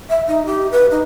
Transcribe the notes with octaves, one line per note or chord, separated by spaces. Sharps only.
E5
D#4
G4
B4
D#4